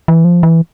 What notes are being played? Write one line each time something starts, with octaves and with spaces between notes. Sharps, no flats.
E3
F3
E3